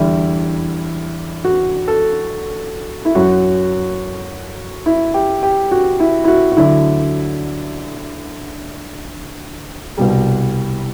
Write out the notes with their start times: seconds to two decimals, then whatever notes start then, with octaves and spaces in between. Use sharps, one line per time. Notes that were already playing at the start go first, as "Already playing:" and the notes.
Already playing: E2 D3 G3 E4
1.45 F#4
1.88 A4
3.05 E4
3.15 F#2 F#3 F#4
4.86 E4
5.14 G4
5.43 G4
5.71 F#4
6.00 E4
6.24 E4
6.28 F#4
6.52 F#4
6.57 D2 D3 F#3 E4
9.98 C2 B2 G3